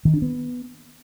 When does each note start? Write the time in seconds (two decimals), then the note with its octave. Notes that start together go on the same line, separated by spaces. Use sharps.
0.05 D#3
0.14 D4
0.22 B3